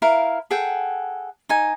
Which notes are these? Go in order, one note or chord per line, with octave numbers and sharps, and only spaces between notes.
E4 A#4 F5
G#4 A4 F#5 G5
D#4 G#5